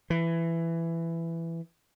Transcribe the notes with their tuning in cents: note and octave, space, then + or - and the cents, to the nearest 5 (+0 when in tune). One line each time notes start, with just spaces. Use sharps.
E3 +15